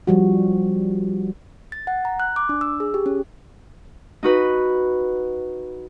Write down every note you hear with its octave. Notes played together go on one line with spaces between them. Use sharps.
F3 G3 F#4
A6
F#5
A#5
F#6
D6
D4
E6
G#4
G4
C#4
D#4 F#4 B4